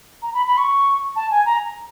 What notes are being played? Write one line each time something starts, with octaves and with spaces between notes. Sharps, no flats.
A#5
B5
B5
C#6
A5
G#5
A#5